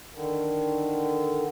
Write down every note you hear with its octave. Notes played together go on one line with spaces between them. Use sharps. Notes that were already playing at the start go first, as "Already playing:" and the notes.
D3 D#3